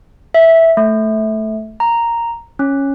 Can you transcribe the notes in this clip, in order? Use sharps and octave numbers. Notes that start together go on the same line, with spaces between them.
E5
A3
A#5
C#4